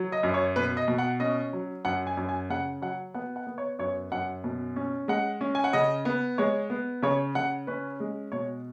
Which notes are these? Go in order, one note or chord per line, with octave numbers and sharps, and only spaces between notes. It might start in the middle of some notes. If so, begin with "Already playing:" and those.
Already playing: F#3
D#5
F#2
C#5
B2 B4
D#5
B2
F#5
C#4 D#5
F#3
F#2 F#5
G#5
F#2
G#5
C#3 F#5
F#3 F#5
B3 F#5
F#5
B3
C#5
F#2 C#5
F#2 F#5
B2
C#4
G#3 F#5
C#4
G#5
F#5
C#3 D#5
B3
G#3 C#5
B3
C#3 C#5
C#3 F#5
C#4 B4
G#3
B2 C#5